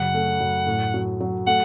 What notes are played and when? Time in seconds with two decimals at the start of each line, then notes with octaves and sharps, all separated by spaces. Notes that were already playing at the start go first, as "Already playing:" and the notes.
Already playing: F#2 C#3 F#5
0.14 A3
0.40 F#2
0.66 A2
0.94 F#3
1.20 F#3
1.47 A3 F#5